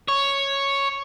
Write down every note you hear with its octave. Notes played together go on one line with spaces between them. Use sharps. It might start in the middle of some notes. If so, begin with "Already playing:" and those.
C#5